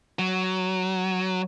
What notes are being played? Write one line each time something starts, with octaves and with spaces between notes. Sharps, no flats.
F#3